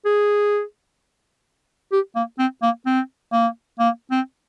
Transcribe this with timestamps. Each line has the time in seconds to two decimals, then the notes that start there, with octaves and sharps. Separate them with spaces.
0.05 G#4
1.92 G4
2.15 A#3
2.39 C4
2.62 A#3
2.86 C4
3.33 A#3
3.79 A#3
4.11 C4